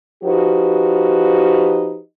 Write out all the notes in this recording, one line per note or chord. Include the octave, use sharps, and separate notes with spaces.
F3 D#4 F#4 G4 B4